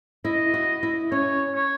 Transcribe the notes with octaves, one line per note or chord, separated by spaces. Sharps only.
E4 D#5
F#4
E4
C#4 C#5
C#5